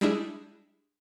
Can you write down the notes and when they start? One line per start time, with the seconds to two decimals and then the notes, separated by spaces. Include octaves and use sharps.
0.01 G3 G#3 D4 E4 G#4